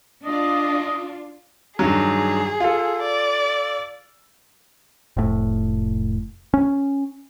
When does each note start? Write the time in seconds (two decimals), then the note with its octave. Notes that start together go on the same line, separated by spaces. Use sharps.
0.25 D4 F4 D#5
1.79 G2 D#3 F#3 G#4
2.60 F4 A4
3.02 D5
5.17 F1 A2
6.54 C#4